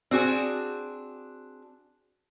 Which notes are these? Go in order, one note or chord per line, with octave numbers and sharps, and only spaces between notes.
C4 D4 F#4 G#4